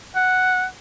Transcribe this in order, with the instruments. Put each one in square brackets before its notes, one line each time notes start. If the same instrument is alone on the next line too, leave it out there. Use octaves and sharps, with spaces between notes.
[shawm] F#5